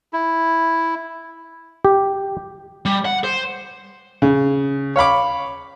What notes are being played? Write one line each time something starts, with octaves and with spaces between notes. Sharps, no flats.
E4
G4
G3
F#5
C5
C#3
C#5 F5 B5 D6